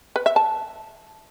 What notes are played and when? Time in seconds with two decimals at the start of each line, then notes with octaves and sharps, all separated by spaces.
0.16 B4
0.26 E5
0.36 A5